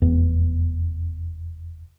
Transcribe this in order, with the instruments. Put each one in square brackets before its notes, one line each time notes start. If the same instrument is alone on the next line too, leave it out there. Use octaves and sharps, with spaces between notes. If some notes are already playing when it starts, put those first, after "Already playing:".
[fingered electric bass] F1 E2 B3